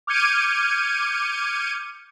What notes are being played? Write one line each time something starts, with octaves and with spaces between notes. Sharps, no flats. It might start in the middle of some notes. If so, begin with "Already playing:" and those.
D6 F6 G6 G#6 C#7 D#7